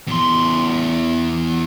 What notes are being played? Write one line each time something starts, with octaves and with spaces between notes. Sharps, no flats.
E2 C6